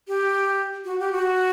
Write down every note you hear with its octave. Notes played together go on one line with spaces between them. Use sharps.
G4
F#4
G4
F#4